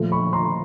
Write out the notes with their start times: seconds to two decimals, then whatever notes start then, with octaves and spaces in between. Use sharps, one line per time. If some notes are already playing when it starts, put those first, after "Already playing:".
Already playing: A#2 F3 A3
0.12 B5 C#6
0.33 A#5 C6